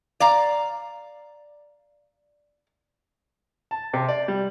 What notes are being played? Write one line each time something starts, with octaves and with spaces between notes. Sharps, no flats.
D5 F5 A#5
A5
C3
D5
G3